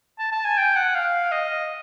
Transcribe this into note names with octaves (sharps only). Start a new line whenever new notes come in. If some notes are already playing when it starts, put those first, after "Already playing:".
A5
A5
G#5
G5
F#5
F5
D#5